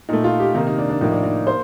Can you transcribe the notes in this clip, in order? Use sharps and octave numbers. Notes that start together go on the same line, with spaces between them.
A#2 A3 D#4
F4
G4
C3 D#3 A#3 D#4
D#4
D4
D4
A2 F3 A#3 D#4
D4
D#4
A#3 C5